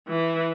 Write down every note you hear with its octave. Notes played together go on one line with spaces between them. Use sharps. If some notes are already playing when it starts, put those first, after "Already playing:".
E3